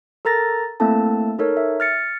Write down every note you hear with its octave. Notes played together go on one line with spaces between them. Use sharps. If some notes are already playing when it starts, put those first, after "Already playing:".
A4 A#4 A#5 A6 A#6
A3 A#3 C4 E4 A4 A5
D#4 A4 A#4 C#5
E5
F6 A6 C#7